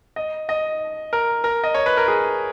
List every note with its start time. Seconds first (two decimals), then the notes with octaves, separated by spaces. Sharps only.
0.16 D#5
0.49 D#5
1.13 A#4
1.44 A#4
1.64 D#5
1.75 C#5
1.86 B4
1.97 A#4
2.08 G#4